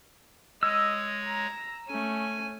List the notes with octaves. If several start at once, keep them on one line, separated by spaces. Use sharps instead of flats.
G#3 C#5 D#5 E6
A#5
A3 C#4 G#5